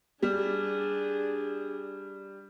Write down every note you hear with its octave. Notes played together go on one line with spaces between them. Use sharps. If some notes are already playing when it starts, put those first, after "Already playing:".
G3 D4 G#4